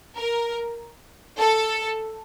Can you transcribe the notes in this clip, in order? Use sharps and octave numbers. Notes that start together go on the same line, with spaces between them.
A#4
A4